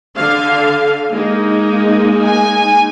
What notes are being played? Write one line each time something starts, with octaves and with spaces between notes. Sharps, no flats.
D3 F5
G#3 A#3 D#4
G#5